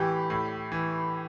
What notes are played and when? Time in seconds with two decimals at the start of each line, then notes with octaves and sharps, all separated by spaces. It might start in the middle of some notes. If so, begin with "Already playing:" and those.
Already playing: A2 E3 G4
0.30 A2
0.72 E3